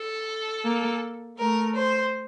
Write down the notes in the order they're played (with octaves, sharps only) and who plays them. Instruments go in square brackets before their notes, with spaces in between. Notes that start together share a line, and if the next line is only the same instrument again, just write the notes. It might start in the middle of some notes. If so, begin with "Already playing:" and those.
Already playing: [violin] A4
[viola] A#3
[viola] A3 [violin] A#4
[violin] C5